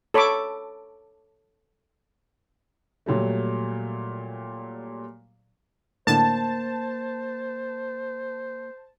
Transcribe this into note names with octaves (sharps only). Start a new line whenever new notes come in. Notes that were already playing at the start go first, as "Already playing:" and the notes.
A4 C#5 B5 C#6 D6
A#2 F#3 G3 A3
A2 D3 A#3 C5 A5 E7